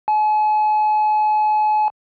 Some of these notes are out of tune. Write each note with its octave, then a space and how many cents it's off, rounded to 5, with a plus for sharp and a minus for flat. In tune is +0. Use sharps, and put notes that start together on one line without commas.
G#5 +45